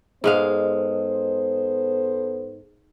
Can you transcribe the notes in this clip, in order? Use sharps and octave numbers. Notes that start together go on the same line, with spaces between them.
G#2 G#3 B3 A4 C5 F5